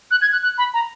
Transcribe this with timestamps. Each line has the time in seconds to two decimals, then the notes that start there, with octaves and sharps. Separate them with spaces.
0.11 F#6
0.22 G#6
0.32 F#6
0.43 F#6
0.58 B5
0.74 A#5